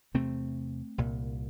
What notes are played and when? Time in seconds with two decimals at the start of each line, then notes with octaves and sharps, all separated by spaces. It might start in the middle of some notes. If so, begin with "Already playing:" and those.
0.14 E2 C3 A3 C4
0.98 C2 A#2